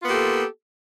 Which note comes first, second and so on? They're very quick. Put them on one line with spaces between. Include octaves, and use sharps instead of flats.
F4 B3 A#3 G4 A4